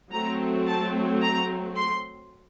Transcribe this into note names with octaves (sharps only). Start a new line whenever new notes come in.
F#3 A3 C4 A#5
A5
A#5
C6